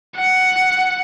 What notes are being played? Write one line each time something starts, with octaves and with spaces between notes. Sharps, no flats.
F#5